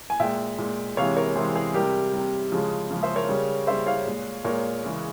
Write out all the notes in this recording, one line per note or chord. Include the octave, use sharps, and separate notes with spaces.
G#5
A#2 G#3 E5 G5
A#2 G#3
C3 E3 G#3 C#5 F5
A#4 C#5
C3 E3 G#3 G#4 C5
G#4
C3 G3 G4 A#4
C3 G3
C#3 F3 G#3
C#3 F3 G#3
C5 E5
A#4 C#5
C#3 G3
C#3 G3 C5 E5
C#5 F5
A#2 G#3
A#2 G#3 A#4 C#5
C#3 E3 G#3